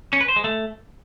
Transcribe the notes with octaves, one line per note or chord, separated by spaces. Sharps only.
C#4
B4
C5
G#3
A3